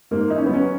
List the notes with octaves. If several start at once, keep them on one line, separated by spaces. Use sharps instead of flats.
G#2 A#3
E3 D#4
C#4
B3
F#3 C#4